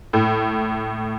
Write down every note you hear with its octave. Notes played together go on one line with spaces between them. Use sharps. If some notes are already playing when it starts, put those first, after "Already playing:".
A2